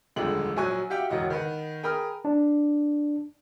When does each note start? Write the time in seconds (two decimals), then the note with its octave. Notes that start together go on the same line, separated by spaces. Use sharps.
0.16 D#1 F2 D3 G#3 F#7
0.57 A#1 F#3 G#5 C#6 F#6
0.90 F#4 G4 E5 F5 G5
1.10 E1 A1 F#4 D#5
1.30 D#3 B4 F#5
1.83 G#4 A#4 G5 B5 D#6 F6
2.25 D4